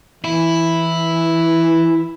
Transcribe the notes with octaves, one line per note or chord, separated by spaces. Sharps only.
E3 E4